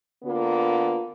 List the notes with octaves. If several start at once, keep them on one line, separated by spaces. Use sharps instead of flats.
D3 A#3 B3 F4